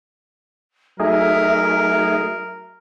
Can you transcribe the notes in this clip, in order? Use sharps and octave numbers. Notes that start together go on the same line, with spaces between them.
F#3 A3 D#4 G#4 A#4 E5